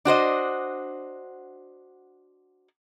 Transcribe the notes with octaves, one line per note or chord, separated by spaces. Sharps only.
D4 F#4 C5 D#5